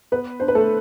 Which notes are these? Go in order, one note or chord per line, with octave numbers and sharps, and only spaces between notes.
B3 B4
D4 C5
B4
A3 A4